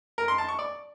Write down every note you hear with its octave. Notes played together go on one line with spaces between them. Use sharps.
A#4
C6
A5
C#6
D5